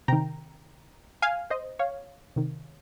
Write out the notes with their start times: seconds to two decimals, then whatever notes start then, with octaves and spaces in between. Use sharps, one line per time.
0.08 C3 D#3 G5 A#5
1.22 F5 G#5
1.50 C5 D#5
1.79 C#5 F5
2.36 C3 D#3